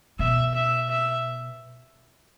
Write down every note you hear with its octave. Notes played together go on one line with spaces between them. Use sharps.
B2 E5
E5
E5